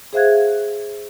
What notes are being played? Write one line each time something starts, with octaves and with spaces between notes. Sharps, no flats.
G#4 C5 E5 F5 F#6 G#6